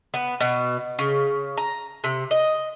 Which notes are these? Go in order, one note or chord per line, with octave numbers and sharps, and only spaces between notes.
B3
B2
C#3
A#5
C3
D#5